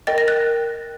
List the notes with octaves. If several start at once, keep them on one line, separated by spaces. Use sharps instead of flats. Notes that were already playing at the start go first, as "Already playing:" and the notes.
A#4 D#5 G5 A6
A#6
F#6 A6